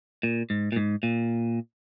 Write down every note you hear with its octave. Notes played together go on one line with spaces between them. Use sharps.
A#2
G#2
A#2
G#2
A#2